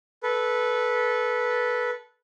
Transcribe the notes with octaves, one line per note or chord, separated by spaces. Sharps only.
A4 B4